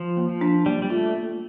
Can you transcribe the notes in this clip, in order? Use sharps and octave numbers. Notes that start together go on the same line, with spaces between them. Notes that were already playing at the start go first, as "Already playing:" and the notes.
Already playing: F3 F4
A#3
F3
D4
G3 A#3
G3
A3 F4
A#3